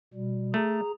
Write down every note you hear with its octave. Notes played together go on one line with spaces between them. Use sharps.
B2 G3
A3 G#4 A#5